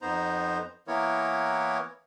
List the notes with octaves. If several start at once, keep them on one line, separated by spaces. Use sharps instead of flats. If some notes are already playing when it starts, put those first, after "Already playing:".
F2 B3 D#4 C5 A#5
E3 A#3 B3 E4 A#4 C#5